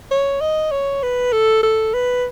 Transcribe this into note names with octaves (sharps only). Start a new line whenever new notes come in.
C#5
D#5
C#5
B4
A4
A4
B4